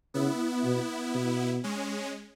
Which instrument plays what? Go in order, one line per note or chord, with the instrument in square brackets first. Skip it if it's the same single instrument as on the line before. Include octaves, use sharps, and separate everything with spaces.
[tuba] C#3 [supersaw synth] B3 E4
[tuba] B2
B2
[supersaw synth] G#3 C#4